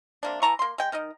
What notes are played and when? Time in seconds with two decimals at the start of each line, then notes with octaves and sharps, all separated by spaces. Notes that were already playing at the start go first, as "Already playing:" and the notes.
0.23 C3 A#3 D4
0.42 E3 A5 A#5 C#6
0.59 A#3 C6
0.78 G#3 G5
0.92 D#3 D#4 A#4 D#5